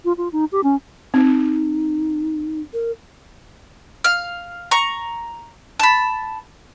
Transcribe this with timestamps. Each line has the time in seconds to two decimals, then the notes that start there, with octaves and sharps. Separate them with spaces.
0.05 F4
0.17 F4
0.32 D#4
0.52 G4
0.63 C#4
1.14 C4 D#4
2.73 A#4
4.04 F5 F6
4.71 A#5 C#6
5.80 A5 B5